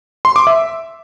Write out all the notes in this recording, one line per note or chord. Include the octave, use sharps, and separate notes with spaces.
C6
D6
E5